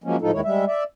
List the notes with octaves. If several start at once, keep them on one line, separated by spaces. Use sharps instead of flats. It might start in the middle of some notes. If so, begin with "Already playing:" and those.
F3 F#3 G#3 A#3 C#4
A2 F3 G#3 D#4 F4 A4
D#2 D#3 G#3 E4 C#5
G3 G#3 E5
D5 E5